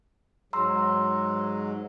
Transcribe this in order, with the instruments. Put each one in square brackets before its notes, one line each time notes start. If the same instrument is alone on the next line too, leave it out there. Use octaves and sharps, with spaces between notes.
[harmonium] G#2 F#3 G#3 [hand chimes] A#5 C6 E6